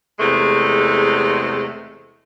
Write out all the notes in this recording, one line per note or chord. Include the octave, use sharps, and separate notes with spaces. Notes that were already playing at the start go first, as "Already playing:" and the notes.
E2 C3 G#3 A3